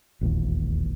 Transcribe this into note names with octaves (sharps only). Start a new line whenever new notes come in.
E1 A#1 D#2